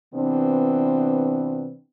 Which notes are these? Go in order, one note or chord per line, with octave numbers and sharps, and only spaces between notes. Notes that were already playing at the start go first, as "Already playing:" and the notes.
C3 E3 B3 C4 D4